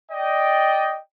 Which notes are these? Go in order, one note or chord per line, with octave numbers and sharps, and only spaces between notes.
D5 D#5 G5